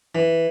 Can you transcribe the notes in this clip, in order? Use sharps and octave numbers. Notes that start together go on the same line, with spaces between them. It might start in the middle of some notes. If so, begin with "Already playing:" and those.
E3